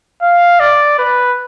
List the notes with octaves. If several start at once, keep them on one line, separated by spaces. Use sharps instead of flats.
F5
D5
B4